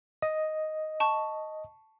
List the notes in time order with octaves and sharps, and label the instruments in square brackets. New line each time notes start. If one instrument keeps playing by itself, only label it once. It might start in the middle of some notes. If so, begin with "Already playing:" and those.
[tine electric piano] D#5
[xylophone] A5 C#6